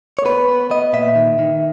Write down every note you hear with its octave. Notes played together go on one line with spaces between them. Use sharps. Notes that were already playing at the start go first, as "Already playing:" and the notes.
C#5
B3 B4
B3
B3 D#5
A#2 E5
D#3
D#3